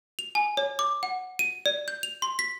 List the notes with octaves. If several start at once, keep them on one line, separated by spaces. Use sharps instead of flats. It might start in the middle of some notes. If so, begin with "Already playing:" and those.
F7
G#5
C#5
D6
F#5
D#7
D5
G6
F7
C6
B6